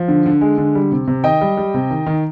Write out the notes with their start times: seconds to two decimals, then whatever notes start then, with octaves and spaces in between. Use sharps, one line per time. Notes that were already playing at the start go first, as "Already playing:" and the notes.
Already playing: F3
0.08 D3
0.26 D3
0.41 G#3
0.58 D3
0.75 G3
0.92 C3
1.08 C3
1.24 D#3 D#5 G5
1.41 G3
1.57 G3
1.74 C3
1.91 D#3
2.06 D#3